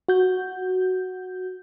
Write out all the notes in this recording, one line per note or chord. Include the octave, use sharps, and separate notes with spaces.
F#4 G6